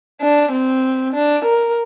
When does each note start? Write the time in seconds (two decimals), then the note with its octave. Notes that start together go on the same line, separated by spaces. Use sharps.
0.22 D4
0.52 C4
1.14 D4
1.45 A#4